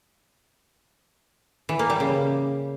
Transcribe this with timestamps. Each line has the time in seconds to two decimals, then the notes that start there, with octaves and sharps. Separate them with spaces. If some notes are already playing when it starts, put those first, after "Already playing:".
1.69 E3
1.79 A#3
1.90 G3
2.00 C#3